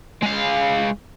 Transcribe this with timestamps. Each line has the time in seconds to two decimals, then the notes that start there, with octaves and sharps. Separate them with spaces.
0.22 G#3 F5